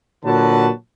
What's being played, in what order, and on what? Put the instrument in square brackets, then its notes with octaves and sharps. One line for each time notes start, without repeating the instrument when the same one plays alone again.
[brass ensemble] A#2 D3 F#3 F#4 B4 A5